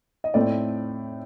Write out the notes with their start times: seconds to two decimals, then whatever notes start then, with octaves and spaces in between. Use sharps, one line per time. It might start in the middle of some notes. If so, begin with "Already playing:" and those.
0.24 D#5
0.34 A2 A3 C4 D5